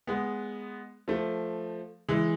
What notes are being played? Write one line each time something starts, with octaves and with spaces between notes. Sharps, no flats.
G#3 B3
F3 A3
E3 G#3